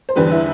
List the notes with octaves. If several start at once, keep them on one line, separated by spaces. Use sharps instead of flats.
C5
E2 D3 G3 B4
E4